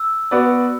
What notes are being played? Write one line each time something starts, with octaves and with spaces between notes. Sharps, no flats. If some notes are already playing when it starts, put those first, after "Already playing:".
Already playing: E6
B3 F#4 B4 D5